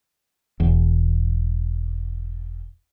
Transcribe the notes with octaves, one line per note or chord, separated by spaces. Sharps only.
E1 E2